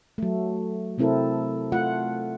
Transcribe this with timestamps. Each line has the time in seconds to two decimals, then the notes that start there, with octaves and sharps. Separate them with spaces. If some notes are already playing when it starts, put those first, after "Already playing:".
0.18 F#3 A3
0.98 C3 A3 C4 E4 A4 A#4
1.72 A3 F4 F#5